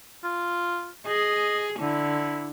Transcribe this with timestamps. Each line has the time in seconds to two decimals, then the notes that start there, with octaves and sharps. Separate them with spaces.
0.24 F4
1.07 G#4 D#5
1.79 D3 E4